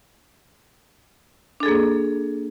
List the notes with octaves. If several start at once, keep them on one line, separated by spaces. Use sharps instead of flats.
A#3 D4 G#4 A4